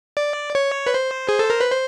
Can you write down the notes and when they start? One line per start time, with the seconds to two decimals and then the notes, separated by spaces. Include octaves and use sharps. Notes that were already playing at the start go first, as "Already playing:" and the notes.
0.17 D5
0.55 C#5
0.86 B4
0.94 C5
1.29 G#4
1.39 A4
1.50 A#4
1.61 B4
1.71 C5